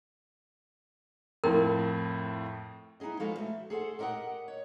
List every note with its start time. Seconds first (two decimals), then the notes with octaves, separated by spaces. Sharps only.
1.44 F2 A2 A#4
3.00 B3 D#4 E4 G#4 D#5
3.20 F3 G#3 F#4 A4 B4 F5
3.38 A3
3.70 G#4 A4 C5 F#5
3.99 G4 A#4 D#5 F5 F#5
4.48 C#5